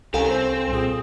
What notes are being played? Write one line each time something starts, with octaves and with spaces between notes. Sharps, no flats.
C2 C#4 G4 A4 A#4 F5 G#5
C4 C5
A#2 G#4